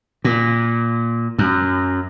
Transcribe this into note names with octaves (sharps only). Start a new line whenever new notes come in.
A#2
F#2